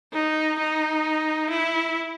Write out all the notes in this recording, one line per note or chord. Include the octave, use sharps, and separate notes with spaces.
D#4
D#4
E4